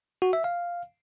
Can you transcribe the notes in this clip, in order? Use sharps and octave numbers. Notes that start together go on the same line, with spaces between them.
F#4
E5
F5